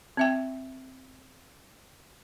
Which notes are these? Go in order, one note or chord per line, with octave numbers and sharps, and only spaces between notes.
C4 E5 G5